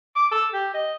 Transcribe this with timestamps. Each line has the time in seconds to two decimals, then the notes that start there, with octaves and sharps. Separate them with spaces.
0.16 D6
0.31 A4
0.54 G4
0.74 D#5